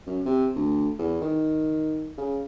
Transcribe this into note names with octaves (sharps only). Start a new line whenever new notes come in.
F#2
C3
D2
E2
D#3
C#3